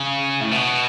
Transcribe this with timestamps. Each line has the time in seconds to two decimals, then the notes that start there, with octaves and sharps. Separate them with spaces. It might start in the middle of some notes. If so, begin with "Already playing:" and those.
Already playing: C#3
0.41 A2
0.51 B2